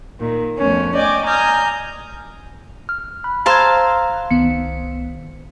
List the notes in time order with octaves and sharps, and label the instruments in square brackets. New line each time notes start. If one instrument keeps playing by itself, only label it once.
[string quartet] A#2 D#3
F2 A3 B3 C#4
D5 D#5 G5 G#5 D6
G#5 A#5 D#6 F6 G6
[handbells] F6
[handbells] B5 [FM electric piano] F#6
[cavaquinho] C5 F5 A5 [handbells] A#5 E6 G#6
[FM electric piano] C2 D#3 B3 [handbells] C#7